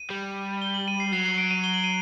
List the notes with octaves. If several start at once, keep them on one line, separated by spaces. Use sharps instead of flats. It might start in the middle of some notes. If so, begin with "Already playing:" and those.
Already playing: D#7
G3
G7
F#7
D#7
C7
F#3 C7
C7
D7
D#7
G7
F#7
D#7